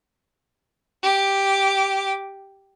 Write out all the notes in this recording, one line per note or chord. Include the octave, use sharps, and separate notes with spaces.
G4 D6